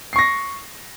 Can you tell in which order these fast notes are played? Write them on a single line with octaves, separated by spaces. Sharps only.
C7 C#6 A#6